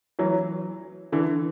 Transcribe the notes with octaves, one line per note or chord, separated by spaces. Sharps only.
E3 F#3
D3 E3